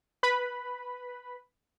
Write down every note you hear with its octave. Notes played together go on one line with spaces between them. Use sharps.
B4 B5